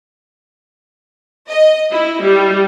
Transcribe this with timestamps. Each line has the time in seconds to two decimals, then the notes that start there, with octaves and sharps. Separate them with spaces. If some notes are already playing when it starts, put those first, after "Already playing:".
1.49 D#5
1.92 E4
2.23 G3